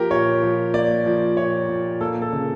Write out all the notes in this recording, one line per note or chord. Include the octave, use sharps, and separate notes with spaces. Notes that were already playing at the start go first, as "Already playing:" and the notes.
Already playing: F3 A#3 G4 A#4
A#2 C#5
F3
A#3 D5
F3
A#2 C#5
A#2
A#3 A4
A4
C#3